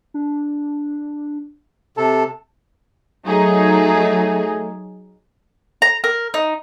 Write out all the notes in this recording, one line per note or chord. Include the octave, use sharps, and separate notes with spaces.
D4
C3 A4 A5
F#3 A3 D#4 G#4
A#5
A#4
D#4